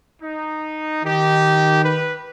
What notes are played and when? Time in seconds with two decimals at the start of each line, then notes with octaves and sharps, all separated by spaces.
0.21 D#4
1.04 D#3 D#4 G4
1.83 B4